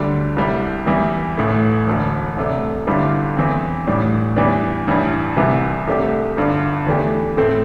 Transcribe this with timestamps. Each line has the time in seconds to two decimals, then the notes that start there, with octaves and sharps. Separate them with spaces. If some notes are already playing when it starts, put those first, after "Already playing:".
Already playing: D2 D3 G3 D4
0.36 C2 C3 G3 E4
0.86 E2 E3 G3 E4
1.37 A1 A2 A3 E4
1.87 E1 D2 D3
2.36 C2 C3 A3 D4
2.87 G1 G2 D3 G3 E4
3.36 E2 E3 C4
3.87 A1 A2 G3 D4
4.36 E2 E3 G3 D4
4.87 A1 G2 E3 G3 E4
5.36 C2 C3 E3 G3
5.87 C2 C3 A3 D4 G4
6.36 G1 G2 D3
6.87 E2 E3 A3 D4 G4
7.37 A2 A3 C4 A4